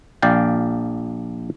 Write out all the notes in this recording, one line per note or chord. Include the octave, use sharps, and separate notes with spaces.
A#1 D5 F5 G5